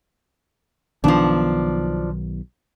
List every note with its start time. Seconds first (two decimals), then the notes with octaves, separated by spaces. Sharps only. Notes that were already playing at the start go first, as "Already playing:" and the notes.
1.04 B1 D#3 F3 B3 D4